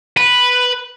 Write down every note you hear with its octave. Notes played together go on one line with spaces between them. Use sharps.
B4